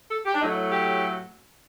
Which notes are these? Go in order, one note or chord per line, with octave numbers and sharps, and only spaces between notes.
A4
G4
D4
A2 F#3 A3 D#4
G4